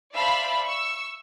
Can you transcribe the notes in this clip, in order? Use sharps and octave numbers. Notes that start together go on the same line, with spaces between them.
C5 D5 E5 F5 A5 B5
C#6 E6